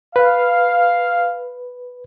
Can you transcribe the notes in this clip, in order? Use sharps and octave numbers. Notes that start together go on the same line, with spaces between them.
B4 F5